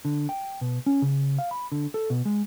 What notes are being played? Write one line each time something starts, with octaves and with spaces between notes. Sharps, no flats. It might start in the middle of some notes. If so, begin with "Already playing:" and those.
D3
G5
B2
C#4
C#3
F5
B5
D3
A4
B2
G#3